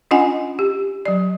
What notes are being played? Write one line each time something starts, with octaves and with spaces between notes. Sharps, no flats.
C#4 D4 F4 D#5 F#5 G#5
G4
F#3 D5